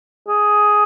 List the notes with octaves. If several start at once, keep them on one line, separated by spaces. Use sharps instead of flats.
G#4